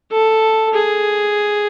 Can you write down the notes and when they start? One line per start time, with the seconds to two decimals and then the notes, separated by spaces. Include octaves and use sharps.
0.12 A4
0.74 G#4